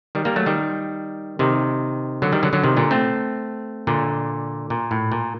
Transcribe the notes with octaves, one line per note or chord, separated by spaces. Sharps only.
D#3 G3
G3 A#3
F#3 A3
D#3 G3
C3 D#3
D3 F#3
D#3 G3
D3 F#3
D3 F#3
C3 D#3
A#2 D3
A3 C4
A#2 D3
A#2
A2
A#2